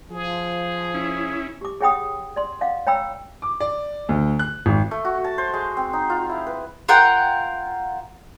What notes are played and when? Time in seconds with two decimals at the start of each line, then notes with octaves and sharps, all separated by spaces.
0.11 F3 G#4
0.94 C#4 E4
1.61 G4 D6
1.81 G#4 C#5 F#5 G5 B5 D#6
2.36 D5 C6
2.61 D#5 F5 F#5 D6
2.87 C#5 G5 A#5 B5 E6
3.42 D6
3.60 D5
4.09 D2
4.39 F#6
4.66 G#1
4.91 A3
5.05 F#4
5.24 A5
5.38 C5
5.54 G#3
5.77 C4
5.93 D#4
6.10 F4
6.29 E4
6.47 B4
6.89 F4 A#4 F#5 G5